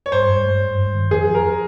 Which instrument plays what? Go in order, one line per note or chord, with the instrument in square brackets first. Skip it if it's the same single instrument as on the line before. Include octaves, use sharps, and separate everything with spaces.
[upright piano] C#5
[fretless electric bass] G2 [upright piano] C5
[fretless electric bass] G2
G#3
G2
G2
D#3
[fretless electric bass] F2 [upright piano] G#4
[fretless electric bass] F3
[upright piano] A#4